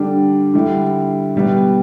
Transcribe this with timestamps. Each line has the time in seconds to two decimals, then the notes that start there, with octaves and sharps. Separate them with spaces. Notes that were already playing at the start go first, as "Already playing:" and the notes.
Already playing: D3 G3 D4
0.54 D3 G3 E4
1.35 B2 G3 B3